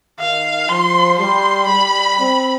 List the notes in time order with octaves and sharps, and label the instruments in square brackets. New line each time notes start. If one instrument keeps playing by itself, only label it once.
[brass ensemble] D#3 [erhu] F5
[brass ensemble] F3 [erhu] C6
[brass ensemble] G3 [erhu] C6
[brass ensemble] G3 [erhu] B5
[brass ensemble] C4